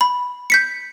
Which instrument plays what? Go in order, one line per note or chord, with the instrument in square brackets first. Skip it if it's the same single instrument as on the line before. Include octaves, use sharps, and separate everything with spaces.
[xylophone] B5
G6 B6 C#7